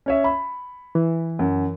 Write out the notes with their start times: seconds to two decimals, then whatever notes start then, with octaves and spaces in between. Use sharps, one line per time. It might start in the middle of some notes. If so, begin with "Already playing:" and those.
0.06 C#4 C#5 E5
0.24 B5
0.95 E3
1.39 F#2